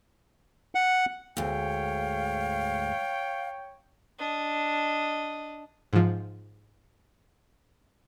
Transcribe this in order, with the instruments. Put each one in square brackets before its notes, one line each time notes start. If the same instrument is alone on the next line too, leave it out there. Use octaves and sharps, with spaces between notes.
[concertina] F#5
[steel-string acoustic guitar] D2 G#2 [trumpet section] C#5 G5 [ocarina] F5
[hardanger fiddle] D4 D#5
[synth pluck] G#2 F3